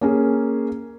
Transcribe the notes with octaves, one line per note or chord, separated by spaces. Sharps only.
A#3 C#4 G#4